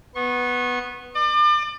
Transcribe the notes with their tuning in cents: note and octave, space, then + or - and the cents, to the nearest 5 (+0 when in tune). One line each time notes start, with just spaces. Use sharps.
B3 +0 C#6 -35
D5 +35 D6 +40